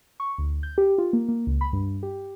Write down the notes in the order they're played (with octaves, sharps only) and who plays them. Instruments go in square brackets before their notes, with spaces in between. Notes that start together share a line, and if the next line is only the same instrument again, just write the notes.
[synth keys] C#6
D2
G6
G4
F4
A#3
A#3
C#2
B5
G2
G4